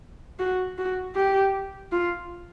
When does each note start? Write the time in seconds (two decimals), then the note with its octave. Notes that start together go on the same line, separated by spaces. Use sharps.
0.39 F#4
0.78 F#4
1.15 G4
1.92 F4